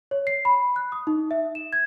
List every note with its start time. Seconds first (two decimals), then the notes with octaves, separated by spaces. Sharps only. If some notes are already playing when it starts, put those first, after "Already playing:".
0.11 C#5
0.27 C7
0.45 B5
0.76 F#6
0.92 D#6
1.07 D#4
1.31 E5
1.55 E7
1.73 G#6